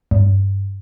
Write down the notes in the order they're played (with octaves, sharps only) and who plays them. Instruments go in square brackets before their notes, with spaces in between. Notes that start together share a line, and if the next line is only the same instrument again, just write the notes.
[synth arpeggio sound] G2